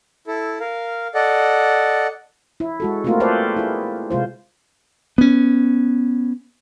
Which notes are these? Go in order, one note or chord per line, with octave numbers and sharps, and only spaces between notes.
E4 A4
A#4 F5
A4 D5 D#5 F#5
E4
G#3 F#4 A4
A3 A#3 C4 F4 F#4 A#4
A4 B4 C5 D5 F5
E4 G#4
C3 G#3 F4 C5
B3 C#4